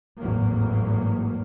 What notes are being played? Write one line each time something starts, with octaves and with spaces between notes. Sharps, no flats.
G#1 E2 A2 F#3 A#3